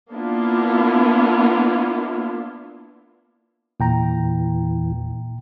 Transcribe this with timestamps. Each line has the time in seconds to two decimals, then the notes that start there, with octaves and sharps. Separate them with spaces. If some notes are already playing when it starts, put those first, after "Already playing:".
0.12 A#3 B3 D4 E4 F4
3.80 E2 A#2 E3 G5 A#5